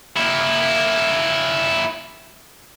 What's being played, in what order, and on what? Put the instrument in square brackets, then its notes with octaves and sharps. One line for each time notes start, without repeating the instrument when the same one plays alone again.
[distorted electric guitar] A#3 E4